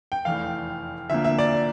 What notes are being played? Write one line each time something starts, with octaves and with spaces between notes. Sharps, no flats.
G5
F1 E2 E3 A3 F5
D2 D3 F3 A#3 E5
E5
D5